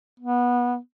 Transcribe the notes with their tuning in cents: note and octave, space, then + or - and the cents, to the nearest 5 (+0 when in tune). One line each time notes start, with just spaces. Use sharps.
B3 -20